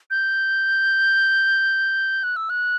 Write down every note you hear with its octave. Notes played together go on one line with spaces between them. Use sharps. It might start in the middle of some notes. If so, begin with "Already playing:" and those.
G6
F#6
E6
F#6